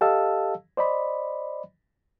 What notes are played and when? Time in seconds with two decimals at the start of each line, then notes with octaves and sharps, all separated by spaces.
0.01 G4 A4 D#5 F5 A5 E6
0.77 C5 D5 D#5 B5